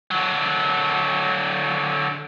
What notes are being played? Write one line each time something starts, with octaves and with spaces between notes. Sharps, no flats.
D3 F#3